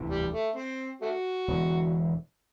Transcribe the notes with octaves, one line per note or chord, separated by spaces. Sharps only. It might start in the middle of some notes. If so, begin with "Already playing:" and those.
Already playing: E1 D2 C3 E3
G3
A3
C4
A3 F#4
E1 E2 D3